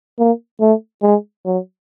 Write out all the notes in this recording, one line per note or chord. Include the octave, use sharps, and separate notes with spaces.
A#3
A3
G#3
F#3